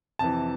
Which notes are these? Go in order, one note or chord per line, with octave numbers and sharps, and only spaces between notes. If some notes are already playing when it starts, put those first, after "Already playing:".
F2 C3 E3 A5